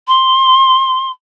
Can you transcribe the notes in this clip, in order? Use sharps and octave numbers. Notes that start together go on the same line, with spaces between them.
C6